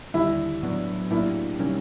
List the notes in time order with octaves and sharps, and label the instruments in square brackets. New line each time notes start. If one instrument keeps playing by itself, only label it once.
[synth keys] D#2 D3 G3 [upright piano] E4
[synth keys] A2 F#3 B3 D4
[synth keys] A2 F#3 A#3 D4 G4 [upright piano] E4
[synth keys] C3 D#3 G3 A#3 C#4